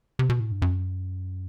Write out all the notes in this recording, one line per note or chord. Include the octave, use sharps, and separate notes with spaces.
C3
B2
A2
G2
F#2